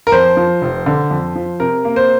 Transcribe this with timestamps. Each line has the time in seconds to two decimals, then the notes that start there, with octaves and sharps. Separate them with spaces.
0.07 A#4
0.12 F2 C5
0.37 F3
0.62 F1
0.86 D3
1.11 F2
1.36 F3
1.60 C3 A#4
1.85 A#3
1.96 C5